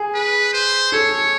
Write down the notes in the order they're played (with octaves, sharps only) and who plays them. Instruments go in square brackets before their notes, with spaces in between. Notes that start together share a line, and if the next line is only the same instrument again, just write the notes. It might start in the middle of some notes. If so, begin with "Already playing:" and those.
Already playing: [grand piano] G#4
[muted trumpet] B4
C5
[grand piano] A4 [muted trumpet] C#5